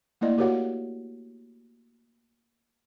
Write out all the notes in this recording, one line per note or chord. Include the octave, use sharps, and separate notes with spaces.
A3 A#3 E4 D5 D#5
F#4 G4 A#4 C#5 F5 F#5